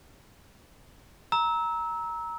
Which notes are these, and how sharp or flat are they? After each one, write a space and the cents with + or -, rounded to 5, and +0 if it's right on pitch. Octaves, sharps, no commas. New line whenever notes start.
A#5 +10 E6 -20